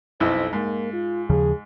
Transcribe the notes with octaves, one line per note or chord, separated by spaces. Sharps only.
B1 F2 E4 C5
G#2 A#3
F4
D#2 C#3 F3 G#4